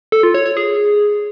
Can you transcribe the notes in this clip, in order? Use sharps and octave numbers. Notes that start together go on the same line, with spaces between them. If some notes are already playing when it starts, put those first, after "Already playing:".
A4
F4
C#5
C#5
G#4